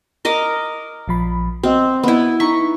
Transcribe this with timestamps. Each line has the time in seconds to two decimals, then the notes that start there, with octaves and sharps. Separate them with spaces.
0.25 A#4 D#5 D6
1.08 A#1 F3 B5
1.63 C4 F#4 D#5
2.03 B3 E4
2.40 D#4 A#5 C#6 B6